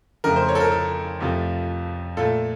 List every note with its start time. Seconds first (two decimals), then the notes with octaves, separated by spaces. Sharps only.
0.24 F2 C#3 A3 A#4
0.36 C5
0.48 C#5
0.55 A4
0.60 A#4
0.72 A4
1.20 F2 C3 F3 A3
2.17 A#2 A3 A4